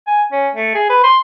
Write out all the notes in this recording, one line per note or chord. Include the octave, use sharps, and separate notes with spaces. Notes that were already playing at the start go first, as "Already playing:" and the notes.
G#5
C#4
A3
G#4
B4
C6